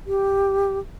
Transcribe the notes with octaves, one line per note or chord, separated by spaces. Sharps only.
G4